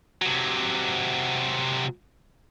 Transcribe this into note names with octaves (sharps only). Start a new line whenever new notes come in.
C3 F#3